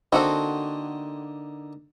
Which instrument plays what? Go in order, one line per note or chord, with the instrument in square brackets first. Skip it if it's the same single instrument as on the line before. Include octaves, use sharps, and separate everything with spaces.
[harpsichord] D3 A#3 D#4 [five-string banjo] C4 F#4 A4